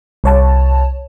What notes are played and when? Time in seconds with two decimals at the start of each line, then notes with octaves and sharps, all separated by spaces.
0.24 C2 C#5 A5